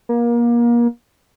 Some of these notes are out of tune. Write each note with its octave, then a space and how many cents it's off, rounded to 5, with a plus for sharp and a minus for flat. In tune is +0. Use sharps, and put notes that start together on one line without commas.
A#3 +30